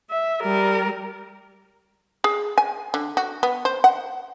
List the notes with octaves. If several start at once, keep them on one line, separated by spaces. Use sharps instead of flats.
E5
G3 A#4
G#4
G#5
D3
F#4
B3
C5
F#5